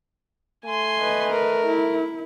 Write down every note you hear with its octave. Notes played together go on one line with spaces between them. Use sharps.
A3 G#5 C6
B4 D#5
A#4
E4